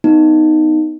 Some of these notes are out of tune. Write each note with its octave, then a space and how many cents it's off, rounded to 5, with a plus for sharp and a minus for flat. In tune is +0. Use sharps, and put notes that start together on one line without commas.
B3 +20 D#4 +0